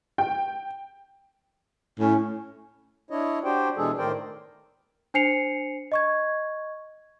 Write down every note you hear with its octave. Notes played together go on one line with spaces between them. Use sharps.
G5
A2 C#4
D4 E4 C#5 D#5
D4 F#4 G4 C5 G5
B2 E3 G#3 D4 G#4 A4
A2 D#3 A#4 C5 D5 G5
D4 C5 G#5 C7 C#7 F7
D#5 C#6 G#6